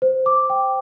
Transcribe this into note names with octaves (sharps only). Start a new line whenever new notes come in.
C5
D6
G5